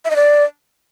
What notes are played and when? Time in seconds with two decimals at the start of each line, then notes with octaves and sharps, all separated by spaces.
0.05 E5
0.10 D#5
0.16 D5